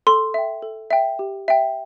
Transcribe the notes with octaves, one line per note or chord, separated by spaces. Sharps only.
A4 C6
E5 G5
A4
E5 G5
G4
E5 G5